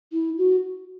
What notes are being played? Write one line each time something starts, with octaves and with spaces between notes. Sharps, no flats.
E4
F#4